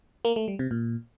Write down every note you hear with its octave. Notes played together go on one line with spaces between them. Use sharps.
A#3
A3
G3
C3
A#2